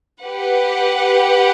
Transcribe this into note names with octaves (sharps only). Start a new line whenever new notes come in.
G4 B4 F#5